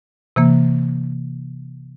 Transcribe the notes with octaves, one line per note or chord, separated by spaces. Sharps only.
C3 E3 A#3